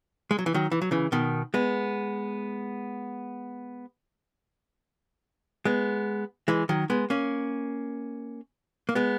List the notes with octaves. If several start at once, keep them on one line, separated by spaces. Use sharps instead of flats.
G#3
F#3
E3
D#3 F#3
E3
F#3
C#3 E3
B2 D#3
G#3 B3
G#3 B3
E3 G#3
D#3 F#3
G#3 B3
A#3 C#4
A#3
G#3 B3